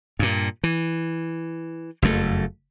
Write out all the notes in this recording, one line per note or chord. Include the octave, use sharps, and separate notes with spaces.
G2 A#2
E3
F#1 F2 A3